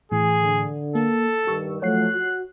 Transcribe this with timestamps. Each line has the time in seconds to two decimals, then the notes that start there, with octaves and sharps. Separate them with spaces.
0.12 A2 E3 G#4
0.41 D3
0.95 A#3 A4
1.47 G2 D#3 G4 C#6 E6
1.82 F3 F#3 A3 C#5 F#5 F#6 C7
2.13 F#4